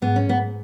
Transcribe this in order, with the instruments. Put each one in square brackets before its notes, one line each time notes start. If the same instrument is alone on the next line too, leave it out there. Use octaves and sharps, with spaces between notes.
[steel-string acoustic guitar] G#2 B3
C#4
G#2 B3